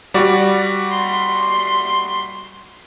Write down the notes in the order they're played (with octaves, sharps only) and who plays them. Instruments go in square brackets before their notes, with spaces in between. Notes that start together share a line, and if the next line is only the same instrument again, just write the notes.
[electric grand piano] G3 F#4 D5
[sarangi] C6